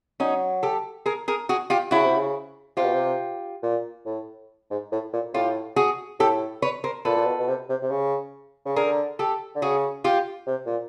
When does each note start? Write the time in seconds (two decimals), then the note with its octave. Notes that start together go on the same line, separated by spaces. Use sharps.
0.20 F#3 C#4 D#4
0.63 G4 A4
1.06 G#4 A#4
1.28 G#4 A#4
1.49 F#4 G#4
1.70 F4 G4
1.91 C#3 E4 F#4
2.04 C3
2.15 C#3
2.77 C3 F4 G4
2.84 B2
2.93 C3
3.63 A#2
4.06 A2
4.70 G#2
4.92 A2
5.13 A#2
5.33 A2 F4 G4
5.76 F#4 G#4
6.20 A2 G4 A4
6.62 B4 C#5
6.84 A#4 C5
7.05 A#2 A4 B4
7.16 A#2
7.27 B2
7.39 B2
7.48 C3
7.69 C3
7.82 C3
7.90 C#3
8.65 C#3
8.76 D3 G#4 A#4
9.19 G4 A4
9.55 D3
9.62 C#3 F#4 G#4
10.04 F4 G4
10.47 C3
10.66 A#2